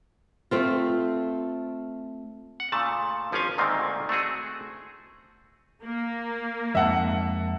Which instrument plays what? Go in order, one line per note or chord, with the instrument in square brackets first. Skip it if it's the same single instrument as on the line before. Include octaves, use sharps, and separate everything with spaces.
[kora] A3 C4 F4
[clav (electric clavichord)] F#5
A#2 C#3 A3 A5
G#1 F3 C#4 B4 F5 G#5
D2 G#2 D#3 A3 A#3 C4
A3 C4 F#4 G#4
[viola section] A#3
[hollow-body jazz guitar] F2 G#2 [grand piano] E5 F#5 A5